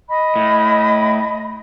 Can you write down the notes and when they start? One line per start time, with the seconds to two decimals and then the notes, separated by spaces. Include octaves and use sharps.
0.07 D#5 B5
0.36 A2